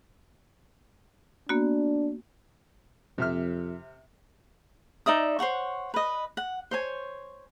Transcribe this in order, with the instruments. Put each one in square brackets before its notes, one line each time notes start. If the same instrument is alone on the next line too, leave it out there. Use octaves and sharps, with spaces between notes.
[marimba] A#3 B3 F#4 [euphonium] D4
[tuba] F2 [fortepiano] C3 E5 F6
[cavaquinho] D#4 D5 E5 D#6
C5 C#5 F#5 C#6
B4 D#5
F#5
C5 C#5 G#5